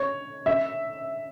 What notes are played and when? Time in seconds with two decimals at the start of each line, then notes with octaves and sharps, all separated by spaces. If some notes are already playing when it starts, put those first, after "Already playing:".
Already playing: C#5
0.46 E5